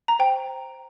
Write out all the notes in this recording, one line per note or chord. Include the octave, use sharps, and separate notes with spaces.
A#5
C5 G5